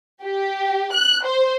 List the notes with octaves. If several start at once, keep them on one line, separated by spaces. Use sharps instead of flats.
G4
F#6
C5